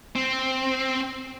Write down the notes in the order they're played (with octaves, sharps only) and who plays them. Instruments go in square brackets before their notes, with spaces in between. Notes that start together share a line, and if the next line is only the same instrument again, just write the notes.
[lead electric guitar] C4